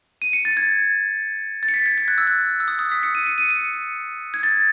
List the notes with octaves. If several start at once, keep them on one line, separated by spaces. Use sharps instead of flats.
D#7
C#7
A6
G#6
A6
C#7
B6
G#6
G#6
F#6
E6
F#6
E6
D#6
D#6
B6
C#7
D#7
C#7
D#7
C#7
G#6
A6